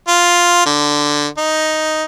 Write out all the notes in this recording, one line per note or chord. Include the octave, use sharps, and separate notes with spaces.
F4
D3
D#4